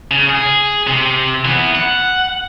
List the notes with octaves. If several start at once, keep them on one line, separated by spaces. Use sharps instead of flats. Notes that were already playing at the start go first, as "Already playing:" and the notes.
C#3
G#4
C3
E3 B3
F#5